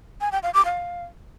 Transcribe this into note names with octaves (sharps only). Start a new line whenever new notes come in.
G#5
G5
F5
D6
F5